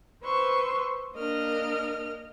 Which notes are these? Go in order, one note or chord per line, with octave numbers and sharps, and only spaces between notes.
B4 C5 C6 C#6 E6
A#3 D4 A#4 D#5 F6